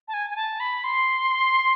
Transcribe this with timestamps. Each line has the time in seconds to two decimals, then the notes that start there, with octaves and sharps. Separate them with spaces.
0.08 A5
0.14 G#5
0.30 G#5
0.36 A5
0.60 B5
0.84 C6